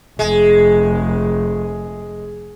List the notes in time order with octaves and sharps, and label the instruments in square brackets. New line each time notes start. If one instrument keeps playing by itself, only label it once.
[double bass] F1 [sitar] G#3